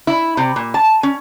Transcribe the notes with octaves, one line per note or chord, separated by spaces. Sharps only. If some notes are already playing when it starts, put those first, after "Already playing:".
E4
C3
A#2
A5
C#4